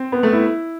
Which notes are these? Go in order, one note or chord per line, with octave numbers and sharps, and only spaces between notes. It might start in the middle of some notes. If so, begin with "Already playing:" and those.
Already playing: C4
B3
A3
E4